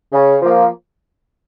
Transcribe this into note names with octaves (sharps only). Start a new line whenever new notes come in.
C#3
F3 A#3